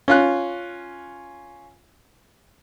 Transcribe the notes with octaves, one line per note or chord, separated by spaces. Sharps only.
C#4 F4 F#6